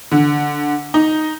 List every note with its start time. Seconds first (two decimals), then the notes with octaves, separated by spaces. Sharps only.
0.12 D3
0.94 D#4